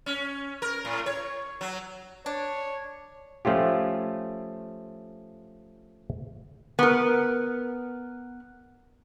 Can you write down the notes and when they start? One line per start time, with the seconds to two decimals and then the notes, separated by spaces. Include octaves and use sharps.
0.06 C#4
0.62 A#4
0.85 A2
1.06 C#5
1.61 F#3
2.26 D4 C#5
3.45 F3 A3 C#4 F4 G4
6.79 B3 A#4